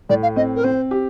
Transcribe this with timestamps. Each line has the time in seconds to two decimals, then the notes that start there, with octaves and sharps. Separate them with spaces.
0.09 A2 D5
0.23 F5
0.36 C4 D#5
0.56 A#4
0.64 C4 C5
0.91 G4